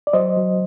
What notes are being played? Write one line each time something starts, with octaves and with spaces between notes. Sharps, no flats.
D5
F#3 C5 D#5
F#3